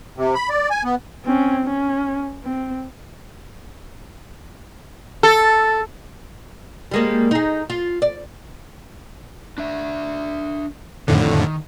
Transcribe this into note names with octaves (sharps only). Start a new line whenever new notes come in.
C3
B5
D5
G#5
B3
C4 C#4
C#4
C4
A4
G3 G#3 A#3
D#4 G#4
F4
D5
D4 E5
F2 A2 D3 D#3